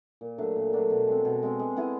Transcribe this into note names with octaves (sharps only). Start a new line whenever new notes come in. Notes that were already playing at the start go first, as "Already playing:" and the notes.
A#2
F#3 A3 D4
A#2
F#3 A3 D4
B2
G#3 C4
B2
G#3 C4
G#3
B3 E4 G#4